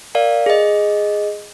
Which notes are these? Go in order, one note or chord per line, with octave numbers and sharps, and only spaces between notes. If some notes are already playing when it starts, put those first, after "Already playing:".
A#4 D5 F5
G#4 D#5